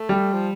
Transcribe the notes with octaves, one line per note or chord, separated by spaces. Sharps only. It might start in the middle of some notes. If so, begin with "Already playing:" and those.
Already playing: A3
G3
F3